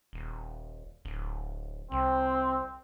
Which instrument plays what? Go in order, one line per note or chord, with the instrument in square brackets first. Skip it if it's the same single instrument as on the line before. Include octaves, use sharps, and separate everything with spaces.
[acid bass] D#1
D1
[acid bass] C2 [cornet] C4